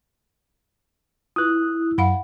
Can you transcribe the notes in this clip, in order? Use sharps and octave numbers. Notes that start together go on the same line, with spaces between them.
E4 F4 B4 D#6 F#6
F#2 F5 F#5 B5